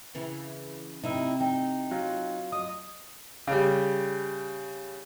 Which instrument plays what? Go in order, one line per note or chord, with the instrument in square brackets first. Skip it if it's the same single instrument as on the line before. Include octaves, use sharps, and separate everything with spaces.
[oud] C#3 E3
[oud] C3 [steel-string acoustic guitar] D#4 E4
[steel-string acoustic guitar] D#4 [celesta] G5
[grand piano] F#3 F4
[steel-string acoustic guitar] D#5 [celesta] D#6
[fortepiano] C#3 G3